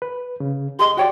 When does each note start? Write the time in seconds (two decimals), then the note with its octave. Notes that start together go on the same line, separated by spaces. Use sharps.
0.02 B4
0.40 C#3
0.79 G4 G#4 D#5 C6
0.97 F#4 C#5 D5 G5